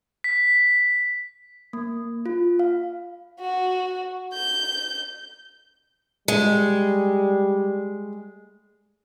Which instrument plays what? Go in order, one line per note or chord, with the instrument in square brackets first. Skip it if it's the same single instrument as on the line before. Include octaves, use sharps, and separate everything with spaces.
[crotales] B6
[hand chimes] A#3
F4
F5
[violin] F#4
G6
[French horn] G3 [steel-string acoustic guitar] G#3